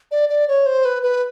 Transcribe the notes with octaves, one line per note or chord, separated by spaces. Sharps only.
D5
D5
C#5
C5
B4
B4